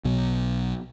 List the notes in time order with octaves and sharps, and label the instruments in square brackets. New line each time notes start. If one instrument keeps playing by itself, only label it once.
[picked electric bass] B1 B2 F#3